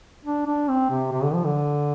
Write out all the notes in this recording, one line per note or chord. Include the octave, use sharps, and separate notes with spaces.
D4
D4
C4
C3
C3
D3
F3
D3